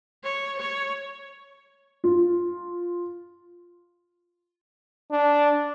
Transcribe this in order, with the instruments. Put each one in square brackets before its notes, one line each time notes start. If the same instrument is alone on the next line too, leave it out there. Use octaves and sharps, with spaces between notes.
[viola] C#5
C#5
[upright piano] F4
[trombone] D4